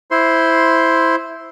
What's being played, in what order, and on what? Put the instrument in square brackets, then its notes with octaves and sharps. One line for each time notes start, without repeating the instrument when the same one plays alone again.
[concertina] E4 C5 C6